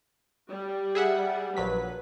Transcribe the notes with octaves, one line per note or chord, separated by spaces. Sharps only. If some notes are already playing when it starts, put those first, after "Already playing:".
G3
G#4 E5 F#5
A#1 F#3 B4 B6